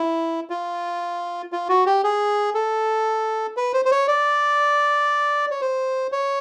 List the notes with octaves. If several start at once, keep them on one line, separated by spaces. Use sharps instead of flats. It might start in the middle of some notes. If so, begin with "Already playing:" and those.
Already playing: E4
F4
F4
F#4
G4
G#4
A4
B4
C5
C5
C#5
D5
C#5
C5
C#5